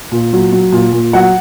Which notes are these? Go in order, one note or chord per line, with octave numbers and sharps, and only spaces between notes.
A#2
F#3
F#3
A#2
A#2
F#3 F#5